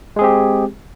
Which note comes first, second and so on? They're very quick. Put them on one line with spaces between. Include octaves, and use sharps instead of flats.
G#3 G#4 C4 G4